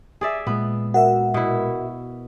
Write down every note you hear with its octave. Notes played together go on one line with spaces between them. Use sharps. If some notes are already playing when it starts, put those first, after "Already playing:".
G#4 D5 E5
A#2 G#3 B3
F#4 A#4 E5 F#5
B2 E4